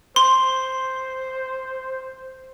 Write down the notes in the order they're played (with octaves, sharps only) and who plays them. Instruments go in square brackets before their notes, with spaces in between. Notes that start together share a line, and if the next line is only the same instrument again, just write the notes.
[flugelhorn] C5 [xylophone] C6